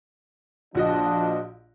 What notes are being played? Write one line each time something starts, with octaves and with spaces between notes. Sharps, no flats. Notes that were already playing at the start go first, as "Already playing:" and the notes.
A#1 F3 D4 F#4 D#5